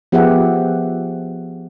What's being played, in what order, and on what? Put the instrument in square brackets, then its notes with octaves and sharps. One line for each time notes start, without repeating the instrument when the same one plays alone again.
[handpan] F3 B3 G4 G#4 E5 F#5